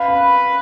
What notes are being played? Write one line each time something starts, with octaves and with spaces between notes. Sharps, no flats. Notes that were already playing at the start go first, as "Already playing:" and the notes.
Already playing: B4 F5
B5